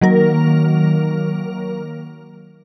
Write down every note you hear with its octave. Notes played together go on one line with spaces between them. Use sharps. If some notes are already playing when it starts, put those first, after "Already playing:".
D#3 F#3 A#3 A#4